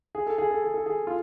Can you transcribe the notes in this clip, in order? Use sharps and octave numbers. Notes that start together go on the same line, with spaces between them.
G#4
A4
G#4
A4
G#4
A4
G#4
F4